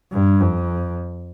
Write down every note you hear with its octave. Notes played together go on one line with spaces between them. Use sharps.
G2
F2